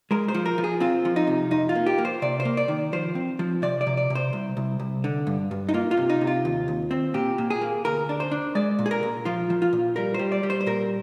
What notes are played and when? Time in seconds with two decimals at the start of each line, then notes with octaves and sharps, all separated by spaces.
0.11 G#3 A#4
0.28 C5
0.34 F3
0.46 A#4
0.58 F3
0.64 G#4
0.80 C4 F4
1.05 F3
1.16 D#4
1.27 C3
1.51 F2 D#4
1.69 F4
1.75 A#3
1.86 G4
1.98 A#3
2.05 C5
2.22 C3 D5
2.40 C5
2.45 A#3
2.57 D5
2.68 D#3
2.93 F3 C5
3.15 C4
3.39 F3
3.62 C3 D5
3.81 D5
3.87 C3
3.97 D5
4.10 C3
4.15 C5
4.33 C2
4.57 C2
4.80 C2
5.04 D3
5.27 G2
5.51 G2
5.69 D#4
5.74 A#3 F4
5.91 F4
5.97 C3
6.10 D#4
6.21 C3
6.27 F4
6.45 D#2
6.68 D#2
6.91 C4
7.14 A#2 G4
7.38 A#2
7.50 G#4
7.61 A#3
7.85 D2 A#4
8.09 D4
8.20 C5
8.31 D4
8.55 G#3 D5
8.79 A#2
8.86 G#4
8.91 A#4
9.03 A#2
9.25 F3 F4
9.50 F3
9.62 F4
9.73 A#2
9.96 G3 A#4
10.14 G3 C5
10.32 D5
10.43 G3
10.50 C5
10.61 C5
10.66 A#2 A#4